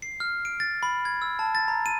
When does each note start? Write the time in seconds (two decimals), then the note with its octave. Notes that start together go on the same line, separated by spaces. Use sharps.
0.02 C7
0.20 F6
0.45 D7
0.60 A6
0.83 B5
1.05 G#6
1.22 E6
1.39 A5
1.55 A6
1.68 A#5
1.86 D#7